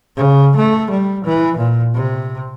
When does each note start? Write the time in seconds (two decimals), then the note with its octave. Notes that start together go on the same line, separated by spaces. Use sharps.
0.16 C#3
0.56 A3
0.90 G3
1.24 E3
1.57 A#2
1.94 C3